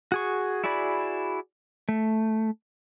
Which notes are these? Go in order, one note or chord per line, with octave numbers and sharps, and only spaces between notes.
F#4 G#4 C#6
E4 F#4 G#4 D5 B5
A3